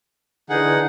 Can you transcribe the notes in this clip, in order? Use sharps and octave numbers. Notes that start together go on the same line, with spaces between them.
D3 E3 D#4 G#4 F#5